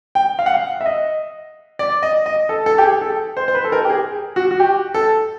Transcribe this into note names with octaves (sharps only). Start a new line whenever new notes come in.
G5
F5
F#5
F5
E5
D#5
D5
D#5
D#5
A4
A4
G4
G#4
A4
C5
C5
B4
A4
A#4
G4
G#4
F#4
F#4
G4
A4